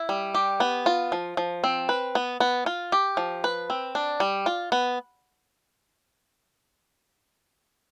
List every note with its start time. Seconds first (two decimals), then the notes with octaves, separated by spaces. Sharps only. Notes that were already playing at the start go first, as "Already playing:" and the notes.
Already playing: E4
0.09 G3
0.35 G4
0.60 B3
0.86 F4
1.12 F3
1.37 F3
1.64 C4
1.89 B4
2.15 B3
2.40 B3
2.66 F4
2.92 G4
3.17 F3
3.44 B4
3.70 C4
3.95 D4
4.20 G3
4.46 F4
4.72 B3